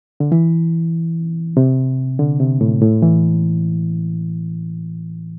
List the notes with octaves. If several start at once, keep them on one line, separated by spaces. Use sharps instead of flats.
D3
E3
C3
D3
C3
A2
A2
E3